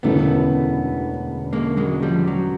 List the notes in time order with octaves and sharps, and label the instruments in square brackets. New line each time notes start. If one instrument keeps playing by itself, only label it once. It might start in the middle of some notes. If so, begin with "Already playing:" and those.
[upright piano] E1 D2 C#3 E3 [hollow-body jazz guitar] A3 B3
[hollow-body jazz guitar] G#3 A#3
F#3 G#3
F3 G3
F#3